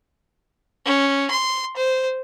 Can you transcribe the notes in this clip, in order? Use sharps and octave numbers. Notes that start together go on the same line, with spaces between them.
C#4
C6
C5